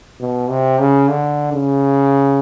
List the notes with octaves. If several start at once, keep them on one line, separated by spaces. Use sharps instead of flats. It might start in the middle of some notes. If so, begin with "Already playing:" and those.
B2
C3
C#3
D3
C#3